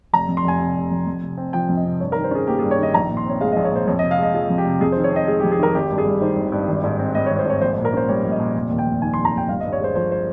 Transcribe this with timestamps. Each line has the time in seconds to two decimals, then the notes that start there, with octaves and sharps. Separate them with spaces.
0.13 F1 A#5
0.28 F2
0.37 C6
0.44 F1 G#5
0.60 C3
0.76 F1
0.91 F2
1.07 F2
1.23 C3
1.37 C4
1.53 F3 G5
1.69 F2
1.77 D#5
1.85 C3
2.00 G2 C#5
2.12 D#3 A#4
2.24 C5
2.31 C#4 G#4
2.47 A#3 G4
2.59 G2 G#4
2.71 C#5
2.78 D#3 D#5
2.94 A#1 A#5
3.09 A#2
3.17 C6
3.25 C4 C#5
3.41 G#3 F5
3.52 A#1 D#5
3.65 C#5
3.72 A#2 C5
3.87 F2 C#5
3.99 C3 D#5
4.11 F5
4.18 G#3 D#5
4.34 F3 G#4
4.50 F2
4.58 G4
4.66 C3
4.81 F2 G#4
4.92 D#3 C5
5.04 C#5
5.12 C4 D#5
5.27 G#3 G#4
5.40 F2 G4
5.52 G#4
5.59 D#3 A#4
5.74 G#1 G4
5.90 G2
5.98 G#4
6.06 G3
6.21 D#3 C5
6.37 G#1
6.52 G2
6.68 G#1
6.84 G#2
6.99 C4
7.15 G3 D#5
7.26 G#1 C#5
7.39 C5
7.46 G#2 C#5
7.61 A#1 C5
7.73 A#2 C5
7.85 A#4
7.93 C#4 C5
8.08 G3 C#5
8.24 A#1
8.32 D#5
8.40 A#2
8.55 F1
8.71 D#2
8.79 G5
8.86 F1
9.02 D#3 G#5
9.14 F1 C6
9.25 A#5
9.33 D#2 G5
9.48 G1 F5
9.60 G2 D#5
9.73 C#5
9.80 G#3 C5
9.95 F3 C5
10.11 C5